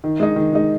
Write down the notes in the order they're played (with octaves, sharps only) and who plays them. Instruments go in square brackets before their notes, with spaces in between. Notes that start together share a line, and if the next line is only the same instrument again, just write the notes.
[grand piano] D#3
G#3 D#4
D#3
G#3 D#4